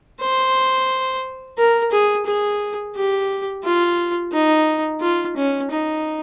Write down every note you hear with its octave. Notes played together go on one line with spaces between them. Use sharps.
C5
A#4
G#4
G#4
G4
F4
D#4
F4
C#4
D#4